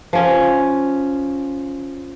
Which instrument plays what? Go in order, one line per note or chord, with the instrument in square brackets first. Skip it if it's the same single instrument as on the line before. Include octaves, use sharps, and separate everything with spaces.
[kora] F3 C#4